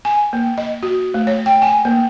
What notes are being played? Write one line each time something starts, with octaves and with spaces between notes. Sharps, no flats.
G#5
A#3
D#5
F#4
A3
C#5
G5
G#5
A#3